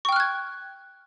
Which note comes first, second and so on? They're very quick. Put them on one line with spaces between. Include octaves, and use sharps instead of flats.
C#6 G5 F6 F#6 G#6